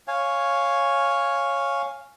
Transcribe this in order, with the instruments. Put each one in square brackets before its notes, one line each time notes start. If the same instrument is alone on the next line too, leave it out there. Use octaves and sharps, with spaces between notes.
[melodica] C#5 F5 G#5